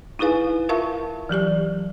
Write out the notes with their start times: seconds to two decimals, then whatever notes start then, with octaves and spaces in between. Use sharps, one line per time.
0.19 D#4 E4 G#4 B4 F5 G#5
0.69 F4 A#4 E5 F5 A5 C#6
1.29 E3 F#3 G4 D5